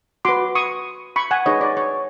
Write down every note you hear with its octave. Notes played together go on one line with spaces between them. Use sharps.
F#4 B4 C6 D6
C#6 D#6
B5 C#6
F#5 G#5
D#4 G#4 B4 C#5 D#5
D5
C#5